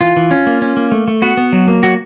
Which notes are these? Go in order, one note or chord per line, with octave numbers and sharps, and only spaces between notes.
E3 F4
E3
C#4
A#3
C#4
A#3
A3
A3
B3 F#4
B3
F#3
A#3
F#3 F#4